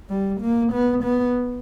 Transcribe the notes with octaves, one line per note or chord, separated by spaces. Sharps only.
G3
A#3
B3
B3